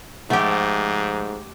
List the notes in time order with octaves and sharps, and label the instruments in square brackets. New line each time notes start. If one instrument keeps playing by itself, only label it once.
[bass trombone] G#2 [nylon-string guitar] F3 F#5 [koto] A3 G4